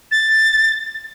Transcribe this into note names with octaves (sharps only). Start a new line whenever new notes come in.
A6